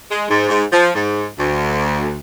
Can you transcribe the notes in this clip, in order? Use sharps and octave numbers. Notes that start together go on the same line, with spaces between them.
G#3
G#2
G#2
F3
G#2
D2